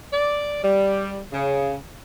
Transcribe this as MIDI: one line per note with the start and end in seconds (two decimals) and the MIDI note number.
0.13 0.62 74
0.64 1.21 55
1.33 1.76 49